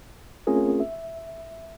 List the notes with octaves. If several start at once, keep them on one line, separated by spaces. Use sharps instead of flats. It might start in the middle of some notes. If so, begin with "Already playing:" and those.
A3 C4 C#4 F4 G#4 A#4
E5